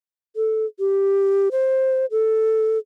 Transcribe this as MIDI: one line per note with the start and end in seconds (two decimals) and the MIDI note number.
0.36 0.65 69
0.79 1.49 67
1.52 2.06 72
2.11 2.78 69